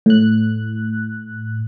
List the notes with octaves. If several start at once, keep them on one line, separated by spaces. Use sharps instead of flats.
A2 F#6